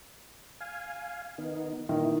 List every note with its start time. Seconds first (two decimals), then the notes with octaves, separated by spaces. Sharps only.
0.61 F5 G#5
1.38 D#3 B3 D#4
1.89 A#2 D#3 E3 E4